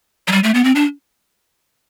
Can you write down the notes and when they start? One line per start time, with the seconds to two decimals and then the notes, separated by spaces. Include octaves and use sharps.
0.28 F#3
0.32 G3
0.44 A3
0.54 B3
0.64 C4
0.75 D4